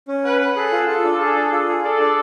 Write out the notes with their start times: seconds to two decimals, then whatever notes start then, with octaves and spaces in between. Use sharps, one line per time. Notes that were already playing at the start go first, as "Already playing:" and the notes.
0.08 C#4
0.24 B4 F#5
0.40 F#5
0.56 G#4 A4
0.72 F4
0.88 F4
1.04 D4
1.21 G#4
1.36 D4
1.52 F4
1.68 G#4
1.84 A4 D5
2.00 D4